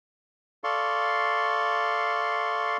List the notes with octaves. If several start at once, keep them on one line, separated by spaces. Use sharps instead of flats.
A4 D5 F5 C6 C#6